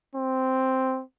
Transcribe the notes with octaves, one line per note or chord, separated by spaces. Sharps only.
C4